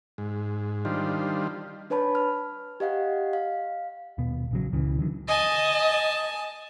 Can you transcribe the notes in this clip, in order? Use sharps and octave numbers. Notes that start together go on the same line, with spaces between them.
G#2
D#3 G3 D4 F4 C5
D4 B4 C#5 A5 B5
F6
G4 D#5 F5 F#5
F5
D#1 B2 B3
A#1 C#3 F#3
C#2 C#3 E3
D3 D#3 F#3
D#5 G#5 A5